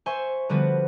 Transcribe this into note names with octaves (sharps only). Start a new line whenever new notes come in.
C5 E5 G#5 C6 C#6
D3 F3 G3 B3 F#4